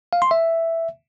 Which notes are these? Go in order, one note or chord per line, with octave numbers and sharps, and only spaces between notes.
F5
C6
E5